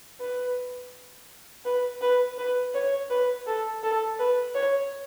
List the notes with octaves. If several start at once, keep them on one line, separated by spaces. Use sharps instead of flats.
B4
B4
B4
B4
C#5
B4
A4
A4
B4
C#5